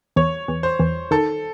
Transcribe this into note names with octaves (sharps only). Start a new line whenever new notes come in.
E2 C#5
E2
C5
E2
D#3 A4